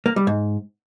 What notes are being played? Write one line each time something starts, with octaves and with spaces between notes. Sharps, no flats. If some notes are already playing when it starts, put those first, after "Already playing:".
A#3
G3
G#2